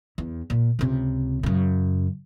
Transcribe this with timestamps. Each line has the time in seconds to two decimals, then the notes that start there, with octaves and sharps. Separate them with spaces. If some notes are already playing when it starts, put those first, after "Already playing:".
0.18 E2
0.50 A#2
0.79 C#2 C3
1.43 F#2 C#3